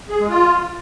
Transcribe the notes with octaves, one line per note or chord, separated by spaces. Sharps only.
G#4
G#3
F4